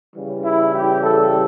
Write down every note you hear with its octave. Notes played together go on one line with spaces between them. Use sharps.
C#3 E3 G3
E4
G4
A4